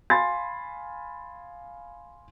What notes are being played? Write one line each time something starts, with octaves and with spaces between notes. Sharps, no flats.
F5 G#5 B5 C6 A6